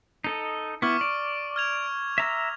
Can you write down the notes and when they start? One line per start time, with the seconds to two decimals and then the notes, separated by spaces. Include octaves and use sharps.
0.24 D#4 A4 D#5
0.82 B3 E4 C#6 D6 F6
1.01 D5
1.56 F6 G#6 F7
2.18 E5 A#5 E6